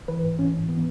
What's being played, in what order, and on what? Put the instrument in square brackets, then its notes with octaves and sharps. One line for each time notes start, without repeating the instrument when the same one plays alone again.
[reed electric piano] E3 B4
G#2
E3 C#4
G#2
E3 B3